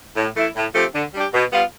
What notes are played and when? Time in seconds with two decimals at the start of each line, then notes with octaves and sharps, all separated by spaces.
0.16 A2
0.37 E3 A3 E4
0.56 A2
0.75 F3 A3 C4 G4
0.94 D3
1.14 G3 D4 G4
1.34 B2
1.52 G3 B3 F4